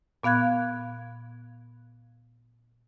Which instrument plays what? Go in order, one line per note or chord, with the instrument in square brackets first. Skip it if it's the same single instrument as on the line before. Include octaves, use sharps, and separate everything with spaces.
[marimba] A#2 B3 F5 F#6 G#6